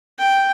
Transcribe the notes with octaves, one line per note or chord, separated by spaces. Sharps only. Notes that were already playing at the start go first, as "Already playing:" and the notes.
G5